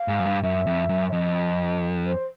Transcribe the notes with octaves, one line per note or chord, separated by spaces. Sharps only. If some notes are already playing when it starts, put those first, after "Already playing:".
Already playing: F5
G#2
F#2
G2
F#2 E5
F2
F#2
E5
F2 D#5
C5